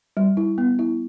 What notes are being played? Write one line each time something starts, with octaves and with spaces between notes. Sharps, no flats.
G3
E4
B3
E4